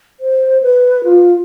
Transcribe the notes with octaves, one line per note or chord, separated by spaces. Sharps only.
C5
B4
F4